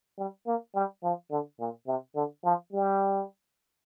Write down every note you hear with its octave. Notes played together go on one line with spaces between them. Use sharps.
G3
A#3
G3
F3
D3
A#2
C3
D3
F3
G3